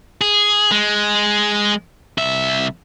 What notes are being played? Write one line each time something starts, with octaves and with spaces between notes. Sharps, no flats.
G#4
G#3
C2 E5